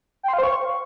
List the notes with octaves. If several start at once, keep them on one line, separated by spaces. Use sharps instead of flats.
G5
C6
F5
C5
C#6